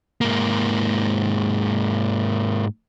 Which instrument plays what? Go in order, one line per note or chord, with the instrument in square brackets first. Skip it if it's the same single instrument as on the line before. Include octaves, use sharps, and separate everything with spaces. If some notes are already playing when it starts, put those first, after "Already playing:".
[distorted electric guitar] G#2 A#3